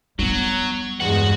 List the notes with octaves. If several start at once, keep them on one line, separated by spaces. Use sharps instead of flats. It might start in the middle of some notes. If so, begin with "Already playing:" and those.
F#3 G3 B3
E2 G2 G#3 F#4 F#5